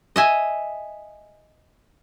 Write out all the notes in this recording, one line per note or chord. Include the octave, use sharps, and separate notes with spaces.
D#5 E5 G#5